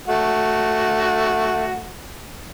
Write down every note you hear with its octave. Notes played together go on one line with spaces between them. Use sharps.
A3 F#4